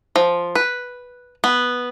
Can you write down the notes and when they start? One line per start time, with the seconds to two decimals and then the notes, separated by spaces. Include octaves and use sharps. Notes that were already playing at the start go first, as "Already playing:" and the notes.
0.16 F3
0.55 B4
1.44 B3